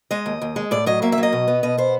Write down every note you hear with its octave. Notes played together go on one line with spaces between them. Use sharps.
G#3 D#5
D#2
D#2
G#3
A2 D5
F#3 D#5
A#3 E5
E5
F#3
D#5
B2
B3
B2 D#5
B3 C5